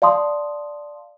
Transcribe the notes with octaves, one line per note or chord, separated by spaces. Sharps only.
D5 F5 A5 C6 D#6